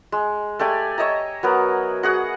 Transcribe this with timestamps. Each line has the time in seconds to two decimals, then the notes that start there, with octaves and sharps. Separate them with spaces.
0.12 G#3
0.59 A3 G4 D5 G#5
0.98 C#5 D#5 E5 A#5
1.43 F#3 B3 A#4
2.03 F#4 G#4 F#5